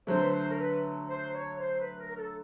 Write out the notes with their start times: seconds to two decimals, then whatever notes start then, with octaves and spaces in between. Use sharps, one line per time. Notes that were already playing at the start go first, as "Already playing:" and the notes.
0.07 D3 F#3 A3 C5
0.20 B4
0.32 C5
0.50 A#4
0.58 B4
1.08 C5
1.35 C#5
1.59 C5
1.79 B4
1.98 A#4
2.09 A#4
2.17 A4